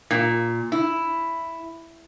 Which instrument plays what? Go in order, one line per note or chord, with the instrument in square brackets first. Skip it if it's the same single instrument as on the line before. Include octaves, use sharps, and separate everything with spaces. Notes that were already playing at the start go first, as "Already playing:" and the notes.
[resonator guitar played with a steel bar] A#2
E4